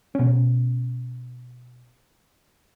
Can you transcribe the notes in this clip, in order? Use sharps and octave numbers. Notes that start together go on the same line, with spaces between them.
B2 C#4